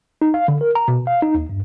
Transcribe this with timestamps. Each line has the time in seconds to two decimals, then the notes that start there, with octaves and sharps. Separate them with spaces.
0.22 D#4
0.34 F5
0.48 D3
0.61 A#4
0.75 A#5
0.88 B2
1.07 F5
1.22 D#4
1.34 D#2
1.49 G2